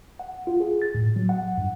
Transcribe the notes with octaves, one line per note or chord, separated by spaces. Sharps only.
F#5
F4
G#4
A6
A2
F#3
F#5
G2